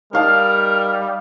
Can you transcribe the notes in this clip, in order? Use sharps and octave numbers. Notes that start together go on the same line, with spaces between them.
G3 D#4 A#4 F5 A5